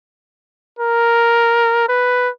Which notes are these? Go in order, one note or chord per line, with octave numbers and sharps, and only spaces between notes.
A#4
B4